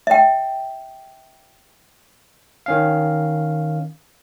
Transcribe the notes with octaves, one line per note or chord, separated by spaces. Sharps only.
E5 G5
D#3 C#4 F5